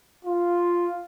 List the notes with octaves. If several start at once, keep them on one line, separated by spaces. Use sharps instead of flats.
F4